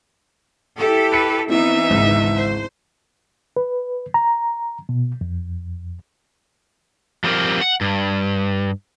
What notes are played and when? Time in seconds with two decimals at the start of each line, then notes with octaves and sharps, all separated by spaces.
0.77 E4 G4 A4
1.12 B4 A6 B6 C#7
1.49 E3 B3 C4 D#4 E4 E5
1.90 G#1 C#2
2.34 C5
3.57 B4
4.14 A#5
4.89 B2
5.21 F2
7.24 F3 G3 C4 G4 A#4
7.61 F#5
7.81 G2